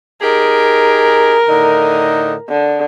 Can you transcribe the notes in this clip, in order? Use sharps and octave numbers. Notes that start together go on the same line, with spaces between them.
D#4 G4 G#4 A#4
A2 D3 D#4
D3